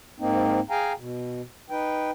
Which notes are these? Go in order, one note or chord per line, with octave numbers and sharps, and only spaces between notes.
G#2 A#3 C4 D#4
G#4 F5 G5 G#5 A#5
B2
D#4 B4 G5